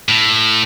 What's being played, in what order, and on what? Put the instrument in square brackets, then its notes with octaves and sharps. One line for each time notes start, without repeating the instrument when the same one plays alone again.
[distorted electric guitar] A2